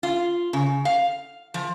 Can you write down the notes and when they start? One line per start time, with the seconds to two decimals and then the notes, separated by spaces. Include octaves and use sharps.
0.03 F4
0.53 C#3
0.85 F5
1.54 F3